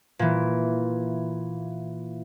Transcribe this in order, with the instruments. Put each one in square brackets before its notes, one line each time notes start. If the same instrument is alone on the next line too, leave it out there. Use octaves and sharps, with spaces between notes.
[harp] A#2 E3